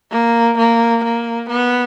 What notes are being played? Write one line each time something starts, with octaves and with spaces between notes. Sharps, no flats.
A#3
A#3
A#3
B3